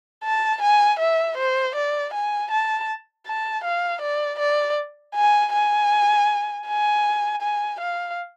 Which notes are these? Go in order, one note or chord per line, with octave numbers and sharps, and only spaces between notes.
A5
G#5
E5
C5
D5
G#5
A5
A5
F5
D5
D5
G#5
G#5
G#5
G#5
F5